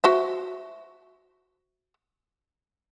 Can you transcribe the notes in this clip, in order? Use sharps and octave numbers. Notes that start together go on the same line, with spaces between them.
F#4 C5 E5